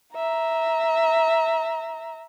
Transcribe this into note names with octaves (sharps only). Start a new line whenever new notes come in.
E5 A#5